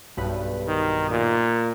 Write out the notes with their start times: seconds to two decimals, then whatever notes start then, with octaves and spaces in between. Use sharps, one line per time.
0.17 B1 G2 B4
0.67 D#3
1.10 A#2